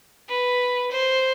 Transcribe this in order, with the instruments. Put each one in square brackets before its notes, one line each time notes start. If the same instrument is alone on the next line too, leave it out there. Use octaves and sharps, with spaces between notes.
[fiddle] B4
C5